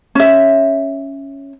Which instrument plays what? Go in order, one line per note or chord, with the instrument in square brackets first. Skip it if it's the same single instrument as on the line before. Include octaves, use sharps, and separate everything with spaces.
[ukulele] C#4 E5